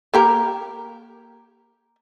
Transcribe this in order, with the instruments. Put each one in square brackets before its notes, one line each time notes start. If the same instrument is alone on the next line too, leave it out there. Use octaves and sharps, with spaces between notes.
[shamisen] A#3 G4 A#4